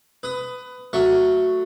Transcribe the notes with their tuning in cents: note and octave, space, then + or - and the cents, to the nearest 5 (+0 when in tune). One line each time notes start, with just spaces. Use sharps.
B4 +20 D#6 +5
F#3 +0 A3 +10 C#6 -5